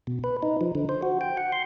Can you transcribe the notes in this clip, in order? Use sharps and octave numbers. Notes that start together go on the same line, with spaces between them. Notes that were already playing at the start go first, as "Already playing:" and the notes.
B2
B4
D#4
F3
D3
C5
F#4
G5
F#5
C6